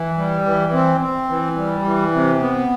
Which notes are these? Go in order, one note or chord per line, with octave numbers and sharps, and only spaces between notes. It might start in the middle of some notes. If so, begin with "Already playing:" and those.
Already playing: E3
G3
E3
C4
C4
E3
G3
E3
C3
B3